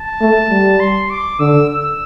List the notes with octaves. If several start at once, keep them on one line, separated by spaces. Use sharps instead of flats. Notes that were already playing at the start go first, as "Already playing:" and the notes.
Already playing: A5
A3
G3
C6
D6
D3 E6
E6